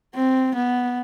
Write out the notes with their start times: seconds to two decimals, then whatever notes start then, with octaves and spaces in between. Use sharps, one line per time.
0.15 C4
0.55 B3